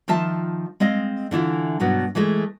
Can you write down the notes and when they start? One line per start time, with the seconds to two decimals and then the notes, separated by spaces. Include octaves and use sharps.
0.08 D#3 F3 F4 E5 A5
0.80 G#3 C4 D#5 F5
1.31 D3 E3 E4 F4
1.80 G2 B2 F#3 B3
2.15 E3 G#3 A3 G#4